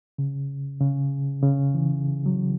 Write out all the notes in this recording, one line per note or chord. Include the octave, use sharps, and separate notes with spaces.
C#3
C#3
C#3
E3
F#3